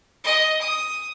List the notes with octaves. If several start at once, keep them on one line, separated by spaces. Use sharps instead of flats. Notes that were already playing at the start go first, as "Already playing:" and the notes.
D#5
D#6